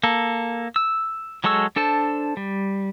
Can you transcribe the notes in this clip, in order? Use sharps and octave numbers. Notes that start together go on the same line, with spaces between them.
A#3 A4
E6
F#3 G#3 A4 C#6 E6
D4 A4 C5 A5
G3